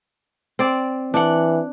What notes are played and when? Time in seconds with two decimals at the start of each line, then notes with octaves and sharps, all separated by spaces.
0.59 C4 D5
1.14 E3 D4 F#5